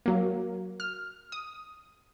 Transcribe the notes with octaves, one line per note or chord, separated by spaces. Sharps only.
F#3 A#3
F6
D#6